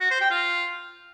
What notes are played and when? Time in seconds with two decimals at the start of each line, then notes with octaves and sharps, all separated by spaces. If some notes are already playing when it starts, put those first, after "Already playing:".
0.01 F#4
0.11 C5
0.21 G5
0.31 F4